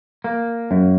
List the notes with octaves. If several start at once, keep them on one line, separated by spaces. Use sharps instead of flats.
A#3
F#2